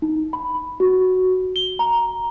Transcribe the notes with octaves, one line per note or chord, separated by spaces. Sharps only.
D#4
B5
F#4
G7
A#5